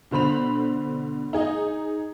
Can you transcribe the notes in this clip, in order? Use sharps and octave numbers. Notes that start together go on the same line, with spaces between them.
B2 D3 C5 B5 F7
D#4 G#4 D#5